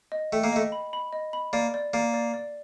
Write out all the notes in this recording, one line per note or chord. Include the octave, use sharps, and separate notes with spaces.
D#5
A3 G5
A#3
A3 D#5
B5
B5
D#5
B5
A#3 D5
D5
A#3 D5
D5
D5